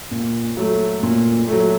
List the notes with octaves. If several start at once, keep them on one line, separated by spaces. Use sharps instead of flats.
A#2
F#3 A3
A#2
F#3 A3